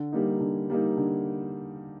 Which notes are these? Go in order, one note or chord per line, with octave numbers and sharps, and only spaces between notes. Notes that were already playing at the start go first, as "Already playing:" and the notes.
Already playing: D3
G3 A#3 D#4
D3
G3 A#3 D#4
D3